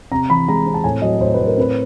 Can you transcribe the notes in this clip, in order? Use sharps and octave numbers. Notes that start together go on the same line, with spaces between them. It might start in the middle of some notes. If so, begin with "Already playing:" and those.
C3 A#5
E3 B5
G#3 A#5
C4
A5
A2 G#5
F#3 D#5
A2 C5
A2 B4
A#4
C4 B4